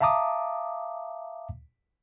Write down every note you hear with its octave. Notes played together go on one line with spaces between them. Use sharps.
E5 F5 A5 A#5 D6 D#6